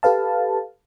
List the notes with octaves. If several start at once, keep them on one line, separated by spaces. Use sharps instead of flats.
G4 A4 B4 F5 A5